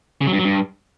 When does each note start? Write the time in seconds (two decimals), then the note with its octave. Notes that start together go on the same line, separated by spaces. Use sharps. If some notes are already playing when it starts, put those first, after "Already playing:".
0.21 C#3
0.27 F#3
0.33 G2
0.39 F#3
0.44 G2